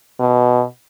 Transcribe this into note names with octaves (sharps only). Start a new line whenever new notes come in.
B2